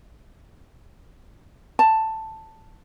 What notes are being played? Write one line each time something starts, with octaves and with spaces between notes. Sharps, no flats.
A5